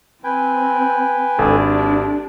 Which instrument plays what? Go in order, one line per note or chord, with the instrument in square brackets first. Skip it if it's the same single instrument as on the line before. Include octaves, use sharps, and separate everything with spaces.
[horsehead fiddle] C4 [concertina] B4 G5 G#5
[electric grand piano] G#1 [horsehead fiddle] D4 G4 [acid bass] A4